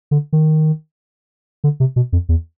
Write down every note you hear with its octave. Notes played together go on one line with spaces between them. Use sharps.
D3
D#3
D3
C3
B2
F2
E2